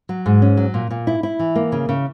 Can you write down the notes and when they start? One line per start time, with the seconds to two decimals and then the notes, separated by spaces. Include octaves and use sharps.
0.09 F#3
0.26 G#2
0.42 C#4
0.57 F#3
0.74 A#2
0.91 A#2
1.07 E4
1.23 E4
1.39 E3
1.55 A#3
1.72 C#3
1.89 C#3